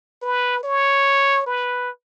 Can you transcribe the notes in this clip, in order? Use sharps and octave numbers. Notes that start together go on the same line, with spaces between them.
B4
C#5
B4